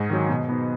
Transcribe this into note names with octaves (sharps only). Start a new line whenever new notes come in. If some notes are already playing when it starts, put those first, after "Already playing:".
Already playing: G#2 D#5
D#3 F#3
B2 D#5
B3 D#4